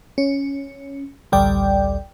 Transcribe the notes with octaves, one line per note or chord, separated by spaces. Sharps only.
C#4
A1 D2 G3 D5 G5